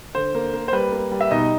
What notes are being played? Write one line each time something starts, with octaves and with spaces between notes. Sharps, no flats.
D3 C5
A#3
A#3
C5
G3 B4
A#3
G3
E5
B2 D#4 D#5